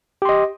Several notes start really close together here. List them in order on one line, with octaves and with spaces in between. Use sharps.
G4 C6 D#5